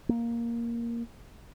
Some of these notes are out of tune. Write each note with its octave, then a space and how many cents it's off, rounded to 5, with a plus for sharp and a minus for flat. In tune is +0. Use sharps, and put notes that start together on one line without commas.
A#3 +5